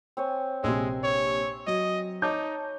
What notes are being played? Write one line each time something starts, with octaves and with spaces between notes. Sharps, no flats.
C4 C#5 G#5
A#1 C3 G#3 E5 G#5 C6
C#5
F#3 D#5
D#4 C#5 A5 D6 G6